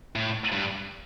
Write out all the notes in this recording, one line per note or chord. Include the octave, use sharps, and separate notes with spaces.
A2
G2